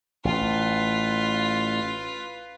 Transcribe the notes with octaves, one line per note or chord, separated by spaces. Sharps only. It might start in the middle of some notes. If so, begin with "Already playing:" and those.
A1 F4 B4